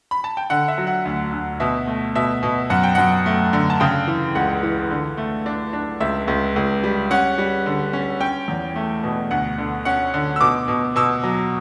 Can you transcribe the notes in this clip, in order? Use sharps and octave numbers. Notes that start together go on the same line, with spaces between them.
B5
A5
G5
D3 F#5
E5
F#3
F#5
D2
D2
B2 E5
A3
B2 E5
B2
F#2 F#5
G5
F#2 F#5
A3
D3
A5
C#3 G5
E3
C#2 F#5
E3
D3
A3
D4
D4
C#2 E5
C#2
C#2
G3
C#4 F#5
G3
D3
C#4
C#4 G5
E2
A3
B2
D2 F#5
D3
C#4 F#5
D3
E6
B2 D6
B2
B2 E6
F#3